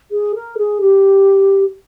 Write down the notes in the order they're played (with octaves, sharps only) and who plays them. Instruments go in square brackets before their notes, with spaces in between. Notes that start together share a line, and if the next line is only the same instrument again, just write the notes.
[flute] G#4
A#4
G#4
G4